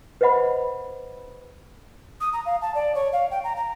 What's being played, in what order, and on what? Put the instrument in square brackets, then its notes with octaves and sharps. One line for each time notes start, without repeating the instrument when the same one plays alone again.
[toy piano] B4 C5 D#5 F#5 B5
[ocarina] D#6
A#5
F5
A5
D5
C#5
F5
G5
A#5
A#5